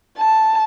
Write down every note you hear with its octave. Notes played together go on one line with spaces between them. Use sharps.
A5